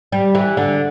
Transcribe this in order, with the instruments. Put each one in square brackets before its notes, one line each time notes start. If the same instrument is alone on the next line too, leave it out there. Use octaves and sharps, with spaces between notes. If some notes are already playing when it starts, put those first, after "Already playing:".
[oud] G3
E3
D3